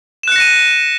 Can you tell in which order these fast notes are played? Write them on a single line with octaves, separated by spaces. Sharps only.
E7 F#6 C#7 A#6 D#7